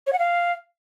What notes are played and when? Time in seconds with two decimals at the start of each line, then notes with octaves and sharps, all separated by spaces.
0.07 C#5
0.13 F#5
0.19 F5